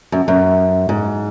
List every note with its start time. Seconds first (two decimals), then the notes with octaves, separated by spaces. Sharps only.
0.12 F#2
0.28 F#2
0.89 G#2